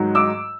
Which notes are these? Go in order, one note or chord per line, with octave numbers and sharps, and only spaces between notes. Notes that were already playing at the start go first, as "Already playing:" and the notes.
Already playing: G#2 D#3 F#3
D6 E6